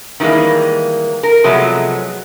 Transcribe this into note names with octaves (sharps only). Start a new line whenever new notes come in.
D#3 E3 G3 G#3 A#3
A#4
C3 F3 F#3 G#3 A3 B3